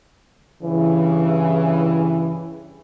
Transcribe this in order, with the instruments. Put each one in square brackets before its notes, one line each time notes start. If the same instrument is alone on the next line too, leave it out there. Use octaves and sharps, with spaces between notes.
[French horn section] G2 C#3 E3